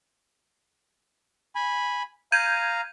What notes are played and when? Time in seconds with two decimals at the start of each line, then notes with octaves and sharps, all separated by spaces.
1.55 G#5 B5
2.32 F5 A#5 G6 G#6 D#7